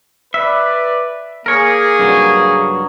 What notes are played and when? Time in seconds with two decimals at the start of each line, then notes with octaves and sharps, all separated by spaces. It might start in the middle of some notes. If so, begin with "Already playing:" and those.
0.34 B4 D5 E5
1.46 A#3 G#4 A#4 C#5
1.99 G2 C#3 F#3